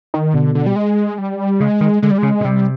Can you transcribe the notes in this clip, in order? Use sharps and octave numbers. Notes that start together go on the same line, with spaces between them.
D#3
B2 D3
D3
G3
G#3
G3
C#3 G#3
D#3
D3 G#3
G3
C#3 G#3
B2
C3 G3